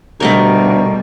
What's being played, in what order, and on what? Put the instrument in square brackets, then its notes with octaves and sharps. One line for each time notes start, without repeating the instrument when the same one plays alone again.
[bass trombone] D2 [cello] B2 G3 [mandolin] A3 D#4 A#4